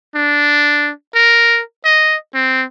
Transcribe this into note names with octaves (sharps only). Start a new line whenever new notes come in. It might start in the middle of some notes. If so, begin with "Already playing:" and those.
D4
A#4
D#5
C4